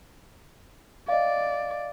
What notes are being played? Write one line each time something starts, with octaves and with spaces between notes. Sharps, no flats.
D5 D#5 F5